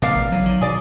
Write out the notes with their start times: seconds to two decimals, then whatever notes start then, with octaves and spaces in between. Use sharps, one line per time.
0.02 B2 D3 A3 A#4 D5 F5
0.16 A#1
0.32 D3 E3 F#3
0.45 D#3
0.61 B2 G#4 D5